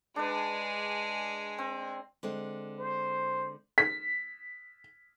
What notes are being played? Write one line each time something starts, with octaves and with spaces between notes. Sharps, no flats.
G#3 D4 G#4 B4
C4
D3 G#3 C4
C5
B6